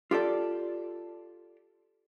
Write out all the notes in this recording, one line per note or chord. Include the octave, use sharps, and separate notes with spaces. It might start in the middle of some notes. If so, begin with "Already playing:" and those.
F4 G4 A4 D5